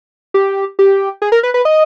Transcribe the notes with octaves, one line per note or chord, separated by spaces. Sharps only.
G4
G4
G#4
A#4
B4
B4
D#5